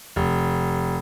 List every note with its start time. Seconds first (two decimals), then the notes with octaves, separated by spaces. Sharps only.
0.16 F1